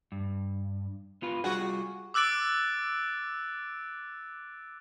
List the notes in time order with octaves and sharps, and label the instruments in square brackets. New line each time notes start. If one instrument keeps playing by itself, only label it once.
[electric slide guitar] G2
B3 F4 B4
[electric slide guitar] G3 F4 G#4 [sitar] F#4
[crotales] D6 E6 F#6 A6 D7